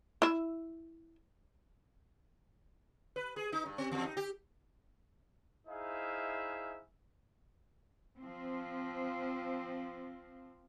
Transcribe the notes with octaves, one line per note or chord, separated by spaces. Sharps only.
E4 E5
B4
G#4
D#4
G2
C4
E2
D#4
G4
D#4 E4 G#4 C5 E5 F5
F3 C4